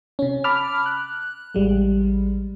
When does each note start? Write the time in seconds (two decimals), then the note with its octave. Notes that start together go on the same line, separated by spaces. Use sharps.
0.19 C3 C#4
0.44 A5 B5 D6 F6
0.86 F#6
1.55 A1 G3 G#3